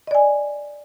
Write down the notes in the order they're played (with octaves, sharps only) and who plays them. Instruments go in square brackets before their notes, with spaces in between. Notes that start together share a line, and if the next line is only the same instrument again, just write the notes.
[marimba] D#5
D5
G#5